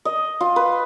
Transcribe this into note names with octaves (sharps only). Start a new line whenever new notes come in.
D#5
F4
B4